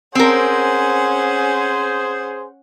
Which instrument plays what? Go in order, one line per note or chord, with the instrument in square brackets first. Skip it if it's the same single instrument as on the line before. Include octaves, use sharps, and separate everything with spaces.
[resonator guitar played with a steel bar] C4 A#4 [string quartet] C#4 F#5 [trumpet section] G#4 C5